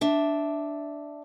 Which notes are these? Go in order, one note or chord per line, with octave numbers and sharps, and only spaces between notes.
D4 E5